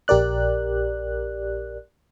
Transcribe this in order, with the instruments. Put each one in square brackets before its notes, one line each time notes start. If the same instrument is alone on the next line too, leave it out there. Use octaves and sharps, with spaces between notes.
[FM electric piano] A#1 G4 A#4 D5 F#6